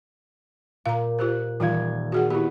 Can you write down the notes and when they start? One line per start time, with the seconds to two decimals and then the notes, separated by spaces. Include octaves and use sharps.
0.86 A#2 F5 A#5
1.19 F4 G4 C5 F#6
1.60 D#1 E3 F4 F5 G#6
2.12 F#4 G#4 F#5
2.30 B3 E4 G4